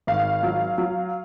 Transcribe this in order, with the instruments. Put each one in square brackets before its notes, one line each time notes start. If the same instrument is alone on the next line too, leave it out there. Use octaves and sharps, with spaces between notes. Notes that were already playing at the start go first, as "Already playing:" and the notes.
[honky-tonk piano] G#1 F5
F#3
F#3